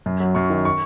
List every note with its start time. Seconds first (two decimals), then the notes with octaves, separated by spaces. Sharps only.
0.06 F#2
0.20 F#3
0.35 F#2 C#6
0.50 D#3
0.65 C#6